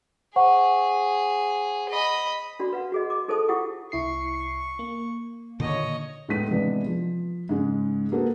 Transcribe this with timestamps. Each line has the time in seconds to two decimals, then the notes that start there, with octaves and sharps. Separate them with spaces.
0.36 G#4 C5 F#5 C#6
1.89 D#5 B5
2.59 D4 F#4 D5 B5
2.73 B4 F5 F#5
2.92 F#4 G#4 D#5
3.10 D6
3.28 D#4 G#4 A4 C5 A5 D#6
3.49 E4 F4 G4 F#5 D#6
3.92 C2 E4 C#6 C7
4.79 A#3
5.60 A#2 D3 D#3 C#5 D#5
6.28 A2 G#3 B3 D#4 B6 D#7
6.51 C3 E3 G#3 B3 D4
6.86 F3
7.49 G#2 C#3 G#3
8.12 A#3 F#4 G#4 A4 B4